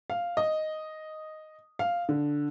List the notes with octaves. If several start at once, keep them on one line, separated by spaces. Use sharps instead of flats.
F5
D#5
F5
D3